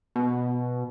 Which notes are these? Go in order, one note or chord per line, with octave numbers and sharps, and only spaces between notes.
B2